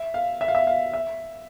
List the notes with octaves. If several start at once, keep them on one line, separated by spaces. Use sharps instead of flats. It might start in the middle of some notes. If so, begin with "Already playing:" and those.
Already playing: E5
F5
E5
F5
E5
F5
E5